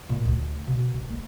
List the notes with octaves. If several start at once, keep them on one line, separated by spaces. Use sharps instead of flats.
A#2
D2
B2
D#3
A#3